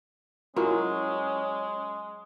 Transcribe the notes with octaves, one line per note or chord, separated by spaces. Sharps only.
F#3 G#3 C#4 E4 F4 A#4